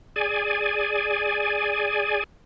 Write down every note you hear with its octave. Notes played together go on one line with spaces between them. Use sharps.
G#4 D5 G#5